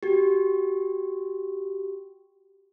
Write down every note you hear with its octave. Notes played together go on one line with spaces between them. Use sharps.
F#4 G4